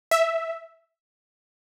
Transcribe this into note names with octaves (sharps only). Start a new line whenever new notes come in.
E5